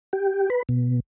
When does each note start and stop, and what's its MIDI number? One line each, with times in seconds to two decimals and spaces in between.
0.13 0.49 67
0.50 0.63 71
0.69 1.00 47